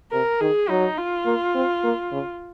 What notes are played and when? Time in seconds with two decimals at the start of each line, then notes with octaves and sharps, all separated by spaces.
0.12 C3 A#4
0.41 D#3 G#4
0.69 F#3 D#4
0.98 F4
1.26 A#3
1.55 C4
1.84 A#3
2.12 C#3